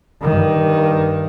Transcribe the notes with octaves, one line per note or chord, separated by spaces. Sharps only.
G2 D#3